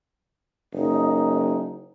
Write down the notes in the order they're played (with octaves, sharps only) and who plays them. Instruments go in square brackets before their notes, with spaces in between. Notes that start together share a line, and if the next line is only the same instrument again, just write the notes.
[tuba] F#1 [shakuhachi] D#4